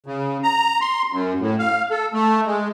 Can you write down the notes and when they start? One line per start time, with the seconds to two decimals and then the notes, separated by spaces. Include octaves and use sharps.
0.06 C#3
0.43 A#5
0.81 C6
1.12 F#2
1.40 A2
1.59 F5
1.90 A4
2.13 A3
2.46 G#3